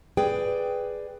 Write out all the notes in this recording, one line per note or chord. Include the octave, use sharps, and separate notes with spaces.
G#4 B4 D5 G5